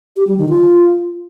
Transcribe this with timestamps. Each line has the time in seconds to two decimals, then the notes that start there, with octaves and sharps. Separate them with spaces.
0.16 G4
0.27 G3
0.38 D#3
0.49 F4